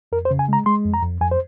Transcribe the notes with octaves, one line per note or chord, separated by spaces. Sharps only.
F2 A#4
C5
C#3
G#5
G#3 A#5
G#3 C6
F2
A#5
F2
F2 G#5
C5